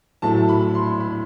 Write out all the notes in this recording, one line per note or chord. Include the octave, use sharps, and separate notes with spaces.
A2 F#3 A3 A5
B5
C6
B5